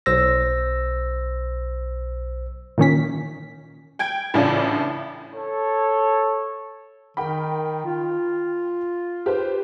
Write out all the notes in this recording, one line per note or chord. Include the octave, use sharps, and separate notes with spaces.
B1 C5 E6 A#6
A#2 D#3 C#4 B6
G5 G#6 D7
A1 A2 C#3 D4 F4
A4 C#5
D#3 A#4 G5 B5
F4
G4 B4 C5